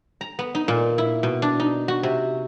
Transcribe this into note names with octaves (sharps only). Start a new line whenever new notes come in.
A#5
B3
D#4
A#2
E4
B2
D4
D#4
F#4
C3